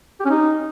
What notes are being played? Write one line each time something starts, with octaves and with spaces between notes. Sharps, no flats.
G4
C#4
D#4